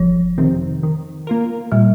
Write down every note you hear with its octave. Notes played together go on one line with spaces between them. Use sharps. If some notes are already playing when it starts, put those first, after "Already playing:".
Already playing: G1 F3
F2 C3 D#3 C4
D#3
A#3 F4 A#4
A#2 G3